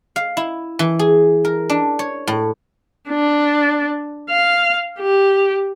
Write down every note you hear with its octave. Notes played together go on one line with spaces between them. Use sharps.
F5
E4
E3
G#4
A#4
D4
C#5
A2
D4
F5
G4